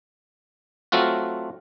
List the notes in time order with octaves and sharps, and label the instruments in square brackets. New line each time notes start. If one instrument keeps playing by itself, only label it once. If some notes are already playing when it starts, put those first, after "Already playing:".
[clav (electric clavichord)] F#3 A3 C4 F4 F#4